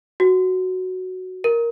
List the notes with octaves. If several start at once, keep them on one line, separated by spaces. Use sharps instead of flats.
F#4
A#4